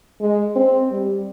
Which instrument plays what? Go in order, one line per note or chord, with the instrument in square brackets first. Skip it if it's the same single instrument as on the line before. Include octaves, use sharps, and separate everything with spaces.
[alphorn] G#3
C4
G3